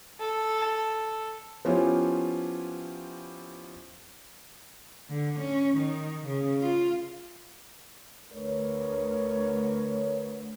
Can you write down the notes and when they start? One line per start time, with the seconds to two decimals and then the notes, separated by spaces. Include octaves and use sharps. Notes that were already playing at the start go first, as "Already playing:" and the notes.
0.20 A4
1.65 F3 B3 C#4 E4 F4 G4
5.11 D3
5.40 C#4
5.78 D#3
6.26 C#3
6.61 F4
8.33 D2 A#4 B4 C#5